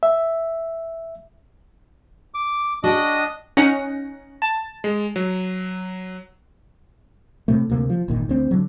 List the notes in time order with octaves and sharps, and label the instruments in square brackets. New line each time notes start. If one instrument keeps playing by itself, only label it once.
[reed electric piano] E5
[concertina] D6
[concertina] D4 D#5 D#6 [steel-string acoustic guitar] F#4 G5
[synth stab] C#4 D#4 F#5 [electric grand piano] A#6
[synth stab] A5
[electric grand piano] G#3
F#3
[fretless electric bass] A2 C3 A3
D2 C3 A#3
F3
G1 A#2 D#3
D2 C4
D3 F#3